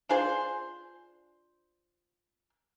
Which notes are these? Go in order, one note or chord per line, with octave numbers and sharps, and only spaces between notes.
D4 F4 G#4 C5